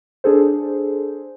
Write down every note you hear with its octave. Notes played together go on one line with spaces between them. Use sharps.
D4 G#4 A4 C5